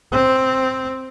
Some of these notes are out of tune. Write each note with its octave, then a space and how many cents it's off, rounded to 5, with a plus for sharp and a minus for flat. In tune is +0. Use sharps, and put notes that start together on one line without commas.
C4 +0